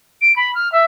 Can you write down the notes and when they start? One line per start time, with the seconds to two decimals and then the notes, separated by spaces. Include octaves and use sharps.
0.21 D7
0.36 B5
0.55 F6
0.72 E5